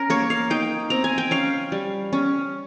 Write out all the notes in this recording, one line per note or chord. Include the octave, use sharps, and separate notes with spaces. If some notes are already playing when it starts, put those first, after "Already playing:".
Already playing: C#4 A#4
A#3 C#5
F5
D#4 G5
C4 A#5
G#5
G5
C#4 F5
G3
C#4